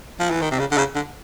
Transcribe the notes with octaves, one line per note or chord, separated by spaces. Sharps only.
F3
E3
D#3
C3
C#3
D3
C#3
D3